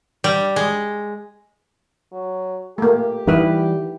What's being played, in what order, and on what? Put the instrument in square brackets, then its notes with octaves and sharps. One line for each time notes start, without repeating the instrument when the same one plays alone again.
[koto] G3
G#3
[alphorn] F#3
[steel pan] A3 A#3 [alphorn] G4
[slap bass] E3 G3 [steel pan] D#4 E4 B4